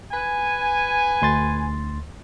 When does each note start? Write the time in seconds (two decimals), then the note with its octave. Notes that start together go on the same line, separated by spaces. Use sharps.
0.11 B4 G#5
1.22 D2 C6 A6